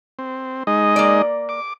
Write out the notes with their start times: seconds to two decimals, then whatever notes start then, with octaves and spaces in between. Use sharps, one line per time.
0.19 C4
0.67 G#3 D#4 D#5
0.96 A#3 D5
1.49 D6